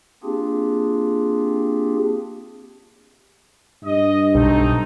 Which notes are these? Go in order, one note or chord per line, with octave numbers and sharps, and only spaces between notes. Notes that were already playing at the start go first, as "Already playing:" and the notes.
A#3 C4 D4 F4 G4 G#4
G2 D#5
B1 G3 A3 C4 D#4